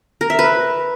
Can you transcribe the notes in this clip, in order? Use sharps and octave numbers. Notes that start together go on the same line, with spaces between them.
A#4
E5
B4